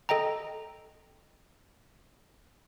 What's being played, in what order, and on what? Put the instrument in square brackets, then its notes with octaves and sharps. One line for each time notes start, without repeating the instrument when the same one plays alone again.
[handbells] A4 D#5 G5 A#5